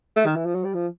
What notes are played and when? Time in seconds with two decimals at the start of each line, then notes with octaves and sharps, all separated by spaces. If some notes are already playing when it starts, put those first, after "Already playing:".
0.16 A3
0.26 D#3
0.36 E3
0.46 F3
0.55 F#3
0.64 G3
0.74 F3